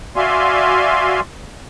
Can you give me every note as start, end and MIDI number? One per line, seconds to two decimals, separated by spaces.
0.16 1.20 66
0.16 1.20 74
0.16 1.20 76
0.16 1.20 77
0.16 1.20 80
0.16 1.20 84